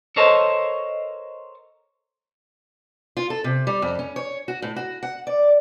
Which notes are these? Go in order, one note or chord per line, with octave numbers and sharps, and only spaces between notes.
A4 A#4 C5 C#5 D#5 A5
F4
A4
C3
G3
F2
C#4
C#5
F#4
A2
F#4
F#5
D5